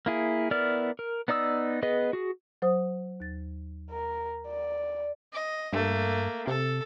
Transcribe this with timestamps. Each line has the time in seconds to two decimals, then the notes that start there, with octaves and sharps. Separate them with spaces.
0.06 A#3 E4 G#4
0.51 B3 E4 A#4 D5 F6
0.99 A#4
1.28 B3 D#4 D5 D#6 E6
1.83 B3 G#4 B4 D#5
2.13 F#4 G#4
2.62 F#3 C5 D#6
3.20 D#2 A6
3.91 A#4
4.47 D5
5.33 D#5
5.73 G2 A3 A#3
6.47 C3 A4